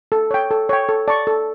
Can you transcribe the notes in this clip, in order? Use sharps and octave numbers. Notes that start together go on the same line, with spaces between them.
A4
C#5 G5
A4
C#5 G5
A4
D5 A5 C#6
A4